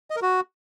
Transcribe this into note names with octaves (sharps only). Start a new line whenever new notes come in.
D#5
A#4
F#4